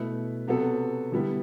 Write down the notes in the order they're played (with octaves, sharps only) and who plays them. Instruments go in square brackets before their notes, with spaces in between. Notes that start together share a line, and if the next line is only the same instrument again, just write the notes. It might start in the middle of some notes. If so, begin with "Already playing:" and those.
Already playing: [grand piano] B2 A3 E4 B4
C3 F#3 B3 F#4 A4
D3 G3 B3 E4